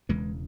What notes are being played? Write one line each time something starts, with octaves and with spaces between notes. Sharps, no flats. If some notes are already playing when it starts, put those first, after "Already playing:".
E1 E2 C#3 E3 G#3